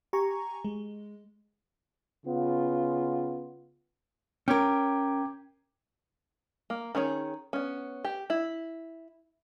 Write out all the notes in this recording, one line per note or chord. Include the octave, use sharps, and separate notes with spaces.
G4 G#5 A#5 C#6
G#3
C#3 B3 F4
C#4 A#4 G5 D6 G#6
A#3
D#3 C#4 G#4 C#5
B3 C#4
G4
E4